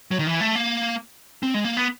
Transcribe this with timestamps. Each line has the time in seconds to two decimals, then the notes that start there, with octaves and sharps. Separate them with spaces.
0.11 F#3
0.19 D#3
0.27 E3
0.41 A3
0.55 A#3
1.43 C4
1.54 G#3
1.65 A#3
1.77 B3